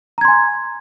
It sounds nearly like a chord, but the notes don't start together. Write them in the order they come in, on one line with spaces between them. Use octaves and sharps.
A#5 G#6 C6 G#5